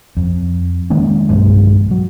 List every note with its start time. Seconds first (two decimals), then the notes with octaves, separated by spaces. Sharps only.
0.17 F2
0.90 D#3 G#3 A#3 C#4
1.29 B1 G2 F#3 G#3
1.91 F#3